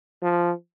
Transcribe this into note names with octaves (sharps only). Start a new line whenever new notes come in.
F3